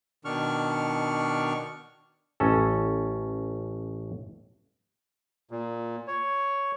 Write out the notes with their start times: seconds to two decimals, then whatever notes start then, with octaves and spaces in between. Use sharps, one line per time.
0.25 B2 D#3 D4 C#6 F6
2.40 A1 C#4 A4
5.51 A#2
6.07 C#5